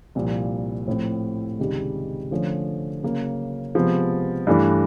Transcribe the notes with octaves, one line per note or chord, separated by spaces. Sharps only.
C2 A#2 F3
A2 F3 A3 C4
C#2 C3 D#3 G3
D3 F3 A3 C#4
C#3 F#3 A#3
C3 F3 G#3 B3
G2 E3 A3 D4